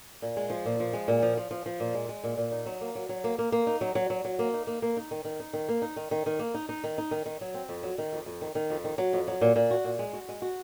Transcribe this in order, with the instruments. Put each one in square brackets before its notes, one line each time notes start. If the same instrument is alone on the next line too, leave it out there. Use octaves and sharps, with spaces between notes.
[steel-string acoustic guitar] A#2
G#3
F3
A#2
F3
G#3
A#2
F3
F3
F3
F3
A#2
G#3
G#3
A#2
A#2
D#4
F#3
A#3
F#3
F#3
A#3
A#3
A#3
D#4
F#3
F#3
F#3
F#3
A#3
D#4
A#3
A#3
D#4
D#3
D#3
D#4
D#3
A#3
D#4
D#3
D#3
D#3
A#3
D#4
D#4
D#3
D#4
D#3
D#3
F#3
C4
F2
F#3
D#3
F2
F2
D#3
D#3
F2
D#3
F#3
F2
F#3
A#2
A#2
F#4
A#2
G#3
F#4
G#3
F#4